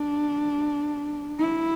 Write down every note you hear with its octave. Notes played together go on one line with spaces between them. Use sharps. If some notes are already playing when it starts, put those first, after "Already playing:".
Already playing: D4
E4